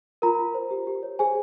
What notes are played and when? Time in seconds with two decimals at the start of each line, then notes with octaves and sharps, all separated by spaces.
0.22 F4 A#4 A#5
0.39 F4
0.54 C5
0.71 G4
0.87 G4
1.03 C#5
1.19 G#4 C5 G#5